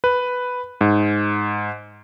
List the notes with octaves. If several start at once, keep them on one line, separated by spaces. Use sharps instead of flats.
B4
G#2